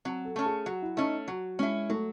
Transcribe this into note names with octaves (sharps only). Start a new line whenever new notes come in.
F#3 C4
A4
A3 C#4
G#4
F#3 F#4
E4
A3 C#4 D#4
F#3 F#4
G#3 C#4 E4
F#3 A3